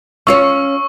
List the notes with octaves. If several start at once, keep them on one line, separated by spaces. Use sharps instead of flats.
C#4 F4 C#5 C#6 E6